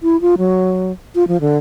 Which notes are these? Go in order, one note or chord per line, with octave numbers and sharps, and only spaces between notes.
E4
F4
F#3
F4
F3
D3